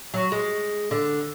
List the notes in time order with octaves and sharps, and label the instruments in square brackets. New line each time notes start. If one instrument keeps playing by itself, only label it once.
[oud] F#3
G#3
D3